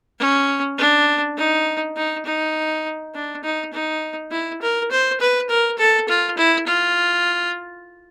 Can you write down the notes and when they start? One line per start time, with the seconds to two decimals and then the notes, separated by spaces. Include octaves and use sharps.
0.19 C#4
0.78 D4
1.37 D#4
1.96 D#4
2.25 D#4
3.14 D4
3.43 D#4
3.73 D#4
4.31 E4
4.62 A#4
4.91 C5
5.20 B4
5.49 A#4
5.78 A4
6.08 F4
6.37 E4
6.67 F4